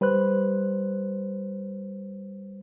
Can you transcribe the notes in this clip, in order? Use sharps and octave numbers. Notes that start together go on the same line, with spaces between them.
G3 B4 C5 F#6